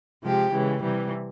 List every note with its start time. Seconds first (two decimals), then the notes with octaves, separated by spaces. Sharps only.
0.25 C3 F3 G#3 G4
0.53 C#3 E3 G#3
0.82 C3 E3 G3